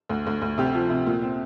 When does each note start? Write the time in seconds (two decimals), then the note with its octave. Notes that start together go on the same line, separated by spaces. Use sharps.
0.09 D2
0.27 D2
0.42 D2
0.58 C3 G4
0.74 F3
0.90 C3
1.07 A#2
1.22 C4